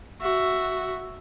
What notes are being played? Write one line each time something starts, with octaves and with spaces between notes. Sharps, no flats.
F#4 E5